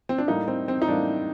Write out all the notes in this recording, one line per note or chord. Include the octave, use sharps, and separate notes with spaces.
C4
D4
A2 G3 A#3 D#4
C4
C4
D#4
A2 G3 A#3 D4